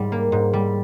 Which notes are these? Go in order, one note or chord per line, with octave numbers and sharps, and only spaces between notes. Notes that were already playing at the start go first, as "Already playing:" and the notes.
Already playing: G#2 G3
A#3
G#2
G3